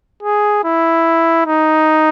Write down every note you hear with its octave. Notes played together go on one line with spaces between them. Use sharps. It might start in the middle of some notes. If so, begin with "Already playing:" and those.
G#4
E4
D#4